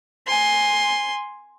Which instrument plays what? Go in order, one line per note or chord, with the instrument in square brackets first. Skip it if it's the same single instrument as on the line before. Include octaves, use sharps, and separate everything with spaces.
[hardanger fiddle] G#5 C6